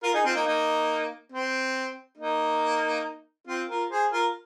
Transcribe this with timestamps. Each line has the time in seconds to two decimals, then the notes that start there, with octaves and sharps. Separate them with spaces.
0.03 F4 A#4
0.14 D#4 G#4
0.25 C4 F4
0.35 A#3 D#4
0.46 A#3 D#4
1.32 C4
2.18 A#3 D#4
3.47 C4 F4
3.69 F4 A#4
3.90 G#4 C5
4.11 F4 A#4